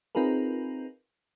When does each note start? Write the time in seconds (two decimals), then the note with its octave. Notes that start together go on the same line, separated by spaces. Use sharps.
0.15 C4 D#4 F4 G#4 A#4 B4